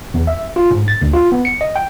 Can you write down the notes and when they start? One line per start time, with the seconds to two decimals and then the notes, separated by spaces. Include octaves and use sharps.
0.14 E2
0.27 E5
0.56 F4
0.71 G#2
0.88 A6
1.02 D2
1.14 F4
1.32 B3
1.45 C#7
1.61 D#5
1.76 G5